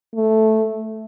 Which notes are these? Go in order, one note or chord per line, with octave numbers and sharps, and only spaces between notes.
A3